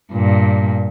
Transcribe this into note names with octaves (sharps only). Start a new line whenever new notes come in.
G2 A#2